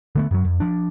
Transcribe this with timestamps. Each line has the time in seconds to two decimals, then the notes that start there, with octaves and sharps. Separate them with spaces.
0.15 D3 A3 B3
0.31 F#2 F#3
0.45 F2
0.60 F3 D4